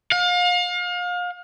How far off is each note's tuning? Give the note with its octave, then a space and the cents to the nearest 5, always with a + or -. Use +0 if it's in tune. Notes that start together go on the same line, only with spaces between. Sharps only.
F5 +35